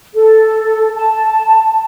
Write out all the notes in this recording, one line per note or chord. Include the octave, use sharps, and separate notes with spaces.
A4
A5